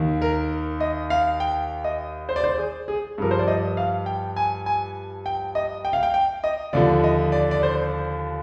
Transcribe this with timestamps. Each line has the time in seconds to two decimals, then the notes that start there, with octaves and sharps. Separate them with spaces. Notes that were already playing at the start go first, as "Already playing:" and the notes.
Already playing: D#2 D#3
0.22 A#4
0.80 D#5
1.10 F5
1.40 G5
1.84 D#5
2.29 C5
2.36 D5
2.44 C5
2.58 G#4
2.88 G#4
3.18 G2 F3 A#4
3.31 C5
3.39 D5
3.47 D#5
3.77 F5
4.06 G5
4.36 G#5
4.66 G#5
5.26 G5
5.55 D#5
5.85 G5
5.93 F5
6.03 G5
6.14 G5
6.44 D#5
6.73 D#2 D3 F3 D5
7.04 D#5
7.32 D5
7.51 D5
7.63 C5